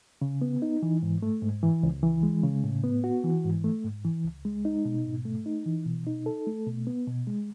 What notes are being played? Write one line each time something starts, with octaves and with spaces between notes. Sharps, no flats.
C#3
B3
D#4
E3
G#2
A3
G#2
E3
C#2
E3
G#3
C#3
A2
B3
F#4
E3
G#2
A3
G#2
E3
C#2
G#3
D#4
B2
G#2
A3
D#4
E3
B2
D#4
A4
A3
B2
B3
B2
G#3